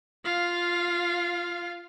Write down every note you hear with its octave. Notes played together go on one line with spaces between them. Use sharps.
F4 F5